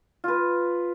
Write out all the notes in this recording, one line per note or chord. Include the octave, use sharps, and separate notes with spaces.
F4 B4